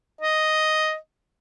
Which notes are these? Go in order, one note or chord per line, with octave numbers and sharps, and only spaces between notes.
D#5